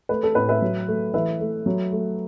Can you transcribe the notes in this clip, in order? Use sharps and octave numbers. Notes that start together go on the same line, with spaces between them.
A3 B4
A4
A2 B4
B4 E5
F#3
A3
E3 B4 E5
A3
F#3
A3